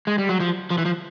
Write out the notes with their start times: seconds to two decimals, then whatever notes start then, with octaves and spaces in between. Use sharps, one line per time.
0.07 G#3
0.18 G3
0.29 F#3
0.40 F3
0.70 F3
0.78 E3
0.85 F3